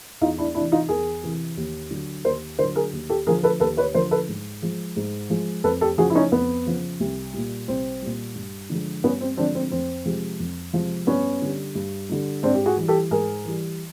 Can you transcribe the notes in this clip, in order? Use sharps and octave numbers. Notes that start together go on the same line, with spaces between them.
E2 D#4 F4
D4 E4
C3 E3 D4 E4
D#4 F4
E2 G#4 A#4
C3 E3
D#2
D3 F#3
D#2 A#4 C5
D3 F#3 A#4 C5
G#4 A#4
D#2
G4 A4
D3 F3 G#4 A#4
A4 B4
D#2 A4 B4
B4 C#5
D3 F3 A#4 C5
A4 B4
G#2
F3 G#3
G#2
F3 G#3
F2 A4 B4
G4 A4
C#3 F3 F#4 G#4
E4
C#4 D#4
F2 B3
C#3 F3
C2
A#2 G3
C2 C4
A#2 G3
G2
D3 F3 G#3
G2 B3 C#4
C4
D3 F3 G#3 C4 D4
C4
F2 C4
C3 F3 G#3
F2
C3 F3 G#3
G2 B3 C#4
D3 G3
G2
D3 G3
G#2 C4 D4
G4
F#4 G#4
E3 G3
G4 A4
G#2 G#4 A#4
E3 G3